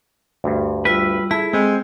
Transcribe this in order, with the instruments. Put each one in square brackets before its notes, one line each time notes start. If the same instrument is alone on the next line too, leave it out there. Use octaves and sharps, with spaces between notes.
[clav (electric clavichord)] D2 G2
[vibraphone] G3 F4 E6 [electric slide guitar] B4
[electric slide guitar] E4 [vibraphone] G#4 E5 B5 [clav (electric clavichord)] A4
[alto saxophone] G#3 [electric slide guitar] C4 [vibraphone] G#4